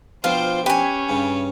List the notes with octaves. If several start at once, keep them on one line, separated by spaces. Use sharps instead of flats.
B2 F3 D4 F4 C5 G5
C#4 G4 B4 G5 G#5
G2 C#3